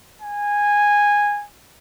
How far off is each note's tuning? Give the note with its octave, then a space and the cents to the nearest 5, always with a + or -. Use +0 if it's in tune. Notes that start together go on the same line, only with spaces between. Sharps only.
G#5 -10